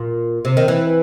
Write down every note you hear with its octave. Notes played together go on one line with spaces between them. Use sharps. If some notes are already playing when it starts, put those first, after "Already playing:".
Already playing: A#2
C3
D#3
E3